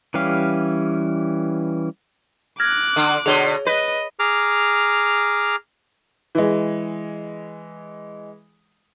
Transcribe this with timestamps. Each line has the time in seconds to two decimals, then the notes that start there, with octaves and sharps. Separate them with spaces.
0.14 E3 G3 C#4 G4 F5
2.60 D6 F6 F#6 G#6 A#6
2.96 D3
3.26 B2 D3 G#4 C#5 G7
3.67 B4 D#5
4.19 G#4 A#5 D6 F6
6.35 E3 G#3